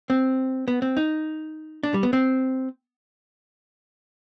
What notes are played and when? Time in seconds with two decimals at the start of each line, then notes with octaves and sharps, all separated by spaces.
0.10 C4
0.68 B3
0.82 C4
0.97 D#4
1.83 D4
1.94 G3
2.03 B3
2.13 C4